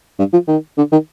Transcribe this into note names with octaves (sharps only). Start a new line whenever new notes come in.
G2
F3
D#3
D3
D#3